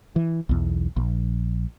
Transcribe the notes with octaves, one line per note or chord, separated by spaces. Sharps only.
E3
B1 E2
A#1